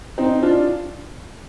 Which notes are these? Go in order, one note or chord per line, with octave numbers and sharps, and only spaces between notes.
C4 D#4
D4 F4